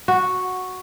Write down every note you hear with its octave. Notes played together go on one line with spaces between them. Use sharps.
F#4